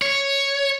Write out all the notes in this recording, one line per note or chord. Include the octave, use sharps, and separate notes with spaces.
C#5